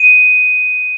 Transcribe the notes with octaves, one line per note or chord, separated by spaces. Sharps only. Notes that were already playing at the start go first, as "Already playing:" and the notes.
Already playing: D#7